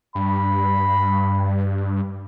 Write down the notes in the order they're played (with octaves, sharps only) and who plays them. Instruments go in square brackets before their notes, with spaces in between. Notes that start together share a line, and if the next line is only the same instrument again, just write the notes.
[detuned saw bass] G2 [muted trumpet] B5